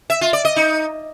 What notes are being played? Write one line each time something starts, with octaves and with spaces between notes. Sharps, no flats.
E5
F4
D5
D#5
D#4